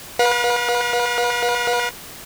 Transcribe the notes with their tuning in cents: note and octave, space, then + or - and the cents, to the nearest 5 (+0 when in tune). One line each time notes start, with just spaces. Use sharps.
B4 -35 F5 +40